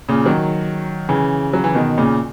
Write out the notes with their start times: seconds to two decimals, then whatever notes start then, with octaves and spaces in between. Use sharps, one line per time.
0.09 A#2 C#3
0.25 D#3 F#3
1.09 C#3 E3
1.53 F#3
1.64 E3
1.75 B2 D#3
1.98 A#2 C#3